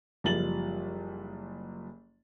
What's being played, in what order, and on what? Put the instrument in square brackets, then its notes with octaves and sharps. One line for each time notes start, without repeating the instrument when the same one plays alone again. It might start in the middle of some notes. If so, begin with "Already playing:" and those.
[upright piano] F#1 F3 G3 A6 F#7